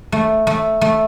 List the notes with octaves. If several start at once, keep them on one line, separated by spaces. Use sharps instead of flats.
A3
A3
A3